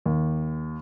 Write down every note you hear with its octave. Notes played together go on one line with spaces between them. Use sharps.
D#2